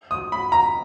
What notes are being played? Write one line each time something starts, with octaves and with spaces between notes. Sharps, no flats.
D#6
B5
A#5